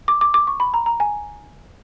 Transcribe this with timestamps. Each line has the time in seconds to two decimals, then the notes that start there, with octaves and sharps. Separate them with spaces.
0.08 D6
0.21 D6
0.34 D6
0.47 C#6
0.60 B5
0.74 A#5
0.86 A#5
1.00 G#5